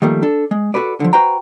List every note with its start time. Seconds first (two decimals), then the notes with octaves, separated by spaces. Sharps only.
0.02 D#3 F3 G3 A3 A#3
0.22 D4 A4
0.51 G#3
0.74 F#4 G4 A4 B4 D5
1.00 D3 D#3 F3
1.13 F#4 B4 C5 G5 A#5